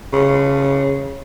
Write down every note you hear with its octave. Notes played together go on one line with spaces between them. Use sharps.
C#3